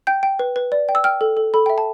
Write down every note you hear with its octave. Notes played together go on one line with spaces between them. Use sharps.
G5 G6
G5
B4
B4
D5
G5
E6
G5 F6
A4
A4
A4 B5
E5 G5
A5